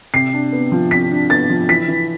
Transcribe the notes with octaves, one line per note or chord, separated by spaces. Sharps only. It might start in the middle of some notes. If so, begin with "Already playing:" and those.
C3 C7
D4
B3
F3
C3 B6
D4
B3 A6
F3
E3 B6
E3